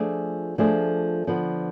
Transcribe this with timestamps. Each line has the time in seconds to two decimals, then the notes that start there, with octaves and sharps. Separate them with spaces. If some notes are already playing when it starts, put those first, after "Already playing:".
Already playing: F3 A3 D4 G#4
0.58 F3 A3 D4 G#4
1.27 D3 F3 B3